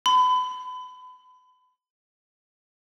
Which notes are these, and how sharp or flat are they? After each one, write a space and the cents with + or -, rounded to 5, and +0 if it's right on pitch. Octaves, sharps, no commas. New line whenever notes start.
B5 +30